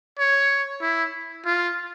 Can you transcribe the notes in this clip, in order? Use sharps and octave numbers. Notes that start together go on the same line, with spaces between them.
C#5
E4
F4